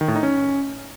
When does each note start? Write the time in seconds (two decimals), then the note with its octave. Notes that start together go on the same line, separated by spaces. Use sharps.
0.01 D#3
0.08 A2
0.16 D#4
0.23 C#4